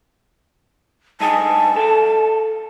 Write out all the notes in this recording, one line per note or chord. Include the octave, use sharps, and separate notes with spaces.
G2 D#4 G#4 A5
A4 F5